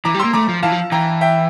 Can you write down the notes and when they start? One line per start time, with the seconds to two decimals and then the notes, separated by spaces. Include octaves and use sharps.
0.05 E3 A#5 D6
0.14 G3
0.19 A#3 C6 E6
0.33 A3 A#5 D6
0.49 F3
0.63 E3 F5 A5
0.72 F3
0.91 E3 G5 A#5
1.21 E5 G5